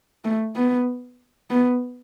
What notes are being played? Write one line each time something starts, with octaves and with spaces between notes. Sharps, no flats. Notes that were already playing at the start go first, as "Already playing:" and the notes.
A3
B3
B3